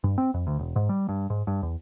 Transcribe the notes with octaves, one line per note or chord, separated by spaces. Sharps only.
G2
C4
F2
D2
E1
G#2
G3
G2
G#2
G2
E2